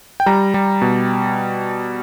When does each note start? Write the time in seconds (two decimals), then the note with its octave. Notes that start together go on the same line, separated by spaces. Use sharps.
0.20 G5
0.26 G3 A#5
0.54 G3
0.82 B2